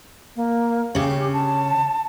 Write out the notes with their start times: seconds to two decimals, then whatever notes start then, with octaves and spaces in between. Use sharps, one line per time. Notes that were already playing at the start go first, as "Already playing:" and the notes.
0.36 A#3
0.95 C#3 C#4 G4
1.33 A5